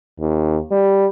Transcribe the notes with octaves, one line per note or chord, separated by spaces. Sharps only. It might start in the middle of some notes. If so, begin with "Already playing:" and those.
D#2
G3